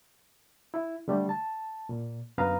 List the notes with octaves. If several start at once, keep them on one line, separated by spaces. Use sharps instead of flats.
E4
D3 G3 A3
A5
A#2
F#2 D3 B3 B4 F5 A#5